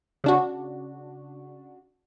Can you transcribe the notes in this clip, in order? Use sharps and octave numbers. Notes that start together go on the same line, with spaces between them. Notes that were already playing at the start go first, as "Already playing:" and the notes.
C#3 D4 F#4